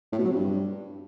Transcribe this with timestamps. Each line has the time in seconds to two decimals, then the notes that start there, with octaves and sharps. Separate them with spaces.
0.13 A2
0.18 B2
0.24 F#3
0.30 C3
0.36 G2